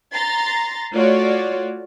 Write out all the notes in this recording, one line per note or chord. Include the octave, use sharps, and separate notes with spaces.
A#5 C6 A6
A3 F4 F#4 C#5 D5